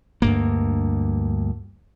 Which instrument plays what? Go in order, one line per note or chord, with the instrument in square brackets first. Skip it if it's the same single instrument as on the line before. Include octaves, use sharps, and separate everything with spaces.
[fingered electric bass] D2 G2 A#3